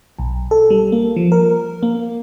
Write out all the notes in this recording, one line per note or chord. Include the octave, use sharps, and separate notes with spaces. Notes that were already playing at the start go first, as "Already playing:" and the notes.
B1
A4
G3
A#3
F3
A#4
A#3